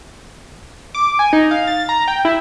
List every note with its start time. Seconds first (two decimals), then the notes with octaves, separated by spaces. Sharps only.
0.95 D6
1.19 G#5
1.33 D#4
1.51 F5
1.67 A6
1.89 A#5
2.08 G5
2.25 E4